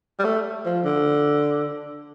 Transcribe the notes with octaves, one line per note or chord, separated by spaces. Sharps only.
G3
A3
F3
D3